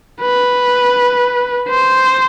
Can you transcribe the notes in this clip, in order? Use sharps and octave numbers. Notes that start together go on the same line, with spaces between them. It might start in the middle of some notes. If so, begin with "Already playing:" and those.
B4
C5